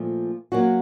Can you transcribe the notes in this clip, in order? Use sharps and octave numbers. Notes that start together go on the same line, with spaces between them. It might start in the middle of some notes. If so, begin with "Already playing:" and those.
Already playing: A#2 F3 A3
F#3 A#3 C#4 F#4